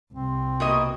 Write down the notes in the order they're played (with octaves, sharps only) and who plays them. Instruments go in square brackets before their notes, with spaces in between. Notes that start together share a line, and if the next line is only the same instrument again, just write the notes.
[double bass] C2 [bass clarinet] C4
[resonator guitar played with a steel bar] B2 A#3 D#5